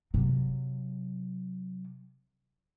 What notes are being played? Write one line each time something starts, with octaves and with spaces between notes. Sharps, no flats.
C3 F#3